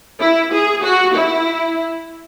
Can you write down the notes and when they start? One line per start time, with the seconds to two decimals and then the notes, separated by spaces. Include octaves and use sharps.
0.21 E4
0.53 G#4
0.83 F#4
1.15 E4